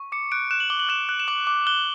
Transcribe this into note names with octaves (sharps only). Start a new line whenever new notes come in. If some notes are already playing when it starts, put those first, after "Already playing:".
Already playing: C#6
D6 C#7
F#6 D7
F#6 E7
F#7
D6 G7
F#7
F#6 E7
F#6
E7
D6 F#7
D6
F#6 G7